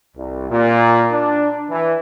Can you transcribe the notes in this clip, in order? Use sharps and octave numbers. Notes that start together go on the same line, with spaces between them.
C2
A#2
D4
E3